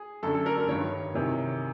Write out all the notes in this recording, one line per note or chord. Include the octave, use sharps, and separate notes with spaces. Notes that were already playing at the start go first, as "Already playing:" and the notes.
Already playing: G#4
F#2 D3 A4
A4
A#4
A#4
G2 D#3 C#5
E2 C3 D#3 C#5